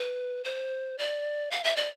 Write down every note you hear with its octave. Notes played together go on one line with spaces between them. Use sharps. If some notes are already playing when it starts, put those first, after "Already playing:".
Already playing: B4
C5
D5
F5
E5
D5